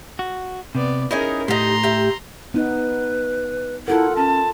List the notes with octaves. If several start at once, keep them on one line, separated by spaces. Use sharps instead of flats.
F#4
C3 B3 D5
C#4 D#4 E4 G#4 A#4 D#5 G#5
A2 A3 D#4 G4 A#5 C6
G4 E5
B3 D#4 B4
E4 F4 A4 A#4 F#5
C#4 A5